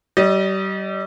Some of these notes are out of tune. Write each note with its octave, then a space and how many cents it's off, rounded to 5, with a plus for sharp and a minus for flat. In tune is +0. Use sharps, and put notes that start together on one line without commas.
G3 -35 D#5 +0